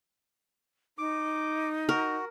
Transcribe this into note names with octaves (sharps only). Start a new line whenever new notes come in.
D#4 D6
F#4 A#4